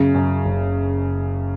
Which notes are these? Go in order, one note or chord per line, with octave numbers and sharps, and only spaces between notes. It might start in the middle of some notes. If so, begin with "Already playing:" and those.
Already playing: F#2 C#3
F#2
F#1